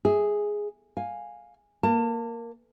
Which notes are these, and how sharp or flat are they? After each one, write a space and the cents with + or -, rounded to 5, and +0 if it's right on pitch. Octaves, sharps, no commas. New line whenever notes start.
G#4 +0 E5 -30
F5 +15 G#5 -5
A#3 +0 A5 +35